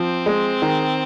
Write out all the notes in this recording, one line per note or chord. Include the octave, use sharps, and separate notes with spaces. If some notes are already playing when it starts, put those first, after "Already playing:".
Already playing: F3 C4
G#3
D#3